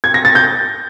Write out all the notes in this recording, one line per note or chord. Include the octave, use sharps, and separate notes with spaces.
G#6
A#6
A6
G6